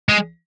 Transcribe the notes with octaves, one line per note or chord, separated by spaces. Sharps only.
G#3